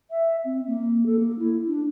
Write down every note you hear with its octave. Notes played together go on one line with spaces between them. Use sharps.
E5
C4
A#3
A4
A#3
E4
D4